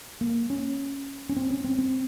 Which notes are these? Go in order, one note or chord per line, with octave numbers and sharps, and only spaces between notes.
A#3
C#4
C#4
C4
C#4
C4
C4